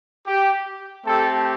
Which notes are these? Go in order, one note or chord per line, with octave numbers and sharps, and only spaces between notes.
G4
A3 C4 G4 A4